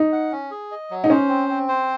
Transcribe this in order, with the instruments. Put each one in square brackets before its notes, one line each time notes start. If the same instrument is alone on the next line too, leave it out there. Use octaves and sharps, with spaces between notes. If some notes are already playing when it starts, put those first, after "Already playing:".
Already playing: [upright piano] D#4
[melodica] F#5
C#4
G#4
D#5
F#3
[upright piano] D#4
[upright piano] C#4 [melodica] C5
[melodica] C4
C4
C5